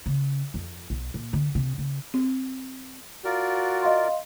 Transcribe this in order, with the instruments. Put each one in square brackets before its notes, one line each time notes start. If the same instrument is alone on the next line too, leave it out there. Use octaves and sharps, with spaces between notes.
[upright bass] C#3
F2
B1
A#2
D3
C3
C#3
[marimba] C4
[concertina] F4 A#4 D5 [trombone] F#4
[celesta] D#5 F5 C6